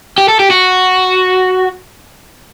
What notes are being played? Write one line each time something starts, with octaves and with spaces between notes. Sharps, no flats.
G4
A4
G4
F#4